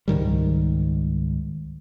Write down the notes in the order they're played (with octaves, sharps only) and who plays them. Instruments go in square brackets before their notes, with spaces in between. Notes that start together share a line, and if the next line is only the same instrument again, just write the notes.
[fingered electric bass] C#2 G#2 D#3 G3